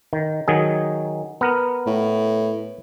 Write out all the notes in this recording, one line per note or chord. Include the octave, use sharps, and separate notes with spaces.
D#3
D#3 F#3 G#4
B3 A#4
A2